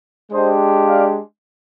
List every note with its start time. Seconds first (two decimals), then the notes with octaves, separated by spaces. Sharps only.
0.32 G#3 D4 G4 C5 D#5
0.87 D5 F5